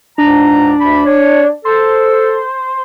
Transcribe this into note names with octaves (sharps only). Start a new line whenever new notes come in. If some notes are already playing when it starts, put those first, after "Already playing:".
C#2 G#2 D4 A#5
D2 B5
C#5
A4 C5